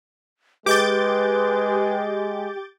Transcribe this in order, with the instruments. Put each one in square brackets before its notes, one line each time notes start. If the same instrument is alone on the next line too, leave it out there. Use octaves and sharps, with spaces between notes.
[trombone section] G#3 [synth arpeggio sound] G4 [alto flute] B4 [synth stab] D6 G6 A6